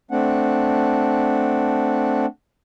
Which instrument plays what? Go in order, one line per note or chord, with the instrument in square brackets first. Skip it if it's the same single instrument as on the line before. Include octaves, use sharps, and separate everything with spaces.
[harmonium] A3 C4 D4 F#5